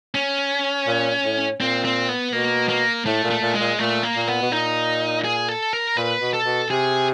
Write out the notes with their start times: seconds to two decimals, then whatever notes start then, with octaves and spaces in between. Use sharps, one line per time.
0.15 C#4
0.87 A#2
1.24 A2
1.60 A#2 C4
1.85 C4
2.09 B3
2.33 B2 A#3
2.69 A#3
3.06 A2 A3
3.24 A#2
3.30 A3
3.42 A#2
3.55 G#3
3.60 A#2
3.79 A#2 A3
4.03 A#3
4.15 A#2
4.27 B3
4.42 B2
4.51 A#2 D#4
5.24 G#4
5.49 A4
5.73 A#4
5.97 A#2 B4
6.21 B2
6.34 A4
6.45 B2
6.70 C3 G#4